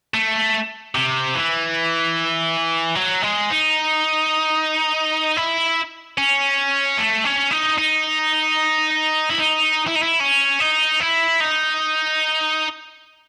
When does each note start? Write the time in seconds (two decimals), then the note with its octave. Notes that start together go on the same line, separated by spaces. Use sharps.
0.14 A3
0.95 C3
1.35 E3
2.96 F#3
3.23 G#3
3.50 D#4
5.37 E4
6.18 C#4
6.98 A3
7.25 C#4
7.51 D#4
7.78 D#4
9.30 E4
9.39 D#4
9.87 E4
9.95 D#4
10.02 E4
10.20 C#4
10.60 D#4
11.00 E4
11.40 D#4